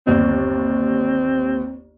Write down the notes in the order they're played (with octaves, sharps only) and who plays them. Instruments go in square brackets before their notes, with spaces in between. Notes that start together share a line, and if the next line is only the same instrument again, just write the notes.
[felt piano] G1 D#2 [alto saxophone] C4